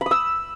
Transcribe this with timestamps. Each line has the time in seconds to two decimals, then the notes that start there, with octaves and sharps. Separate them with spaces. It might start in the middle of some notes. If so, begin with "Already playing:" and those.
0.01 B5
0.06 D#6
0.11 E6